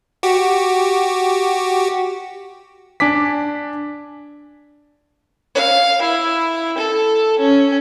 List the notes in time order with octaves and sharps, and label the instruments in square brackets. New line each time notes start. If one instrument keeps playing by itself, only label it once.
[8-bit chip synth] F#4 G4
[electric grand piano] D4 G#5 D6 B6
[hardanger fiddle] F5
E4
A4
C#4